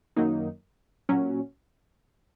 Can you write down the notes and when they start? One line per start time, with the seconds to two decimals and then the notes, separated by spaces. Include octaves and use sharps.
0.16 F#2 D#3 F#3 A#3 D#4
1.09 A#2 F#3 C#4